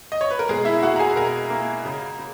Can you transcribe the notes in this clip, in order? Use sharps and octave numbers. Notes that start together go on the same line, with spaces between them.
D#5
C#5
B4
A#4
B2 G#3 G#4
E4 E5
E5
A#3 F#4 F#5
A#5
G#4 G#5
B2 A#4 A#5
A#3
C#3
C#3